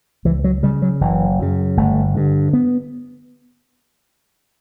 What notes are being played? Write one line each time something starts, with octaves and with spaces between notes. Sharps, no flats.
C#2 E3
F#3
C#3 G3
F#3
F#1 E3
F#2 C#3
G1 A3
G2 D3
B3